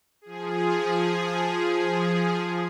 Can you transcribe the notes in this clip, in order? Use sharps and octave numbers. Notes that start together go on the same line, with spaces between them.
F3 G#4